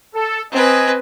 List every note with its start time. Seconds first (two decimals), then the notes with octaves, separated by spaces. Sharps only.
0.15 A4
0.52 C4 B4 D#5 G#5